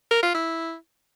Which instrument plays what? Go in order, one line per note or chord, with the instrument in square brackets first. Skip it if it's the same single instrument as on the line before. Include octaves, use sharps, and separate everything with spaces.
[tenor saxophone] A#4
F4
E4